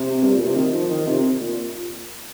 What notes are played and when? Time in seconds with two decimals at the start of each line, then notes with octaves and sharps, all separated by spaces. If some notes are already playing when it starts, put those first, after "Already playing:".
Already playing: C3
0.23 G2
0.34 A#2
0.46 C3
0.56 D#3
0.73 F3
0.90 D#3
1.07 C3
1.41 A#2